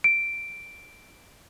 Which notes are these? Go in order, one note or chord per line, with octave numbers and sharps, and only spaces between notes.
D7